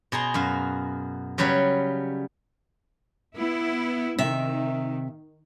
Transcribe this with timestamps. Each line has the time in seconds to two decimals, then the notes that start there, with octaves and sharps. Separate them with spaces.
0.12 B2 G#4 A#5 C6
0.34 F#2 F#4 F5
1.38 C#3 F#3 G3 B4 C#5
3.36 B3 E4
4.18 C3 D#3 E5